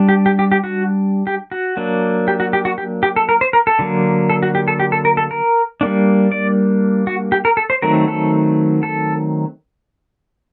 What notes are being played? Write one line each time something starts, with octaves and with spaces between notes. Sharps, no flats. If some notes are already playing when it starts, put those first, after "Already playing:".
Already playing: G3 D4
G4
G4
G4
G4
F#4
G4
F#4
F#3 A#3 D4
G4
F#4
G4
F#4
G4
G4
A4
A#4
C5
A#4
A4
D3 F#3 A#3
A4
F#4
G4
A4
G4
A4
A#4
A4
A#4
G3 A#3 D4
D5
F#4
G4
A#4
A4
C5
D#3 F#3 A3 C4 A#4
A4
A4